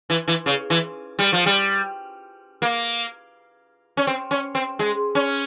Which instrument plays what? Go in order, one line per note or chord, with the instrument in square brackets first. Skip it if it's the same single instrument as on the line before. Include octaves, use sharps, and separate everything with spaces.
[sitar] E3
E3
C#3
E3
G3
F3
G3
A#3
C#4
C4
C#4
C4
G#3
C#4